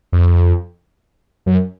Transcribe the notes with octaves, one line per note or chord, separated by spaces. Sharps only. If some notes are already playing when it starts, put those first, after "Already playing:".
F2
F#2